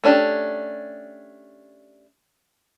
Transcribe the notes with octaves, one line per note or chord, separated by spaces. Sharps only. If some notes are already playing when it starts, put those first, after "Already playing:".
A3 C#4 D4 G4